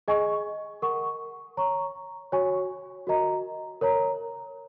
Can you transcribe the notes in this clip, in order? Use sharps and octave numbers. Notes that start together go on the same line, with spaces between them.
G#4 D#5 G#5 C#6
A#4 F#5 C#6
C#5 A#5 C#6
F#4 C#5 G#5 C#6
F#4 A#4 D#5 A#5
A#4 C#5 A#5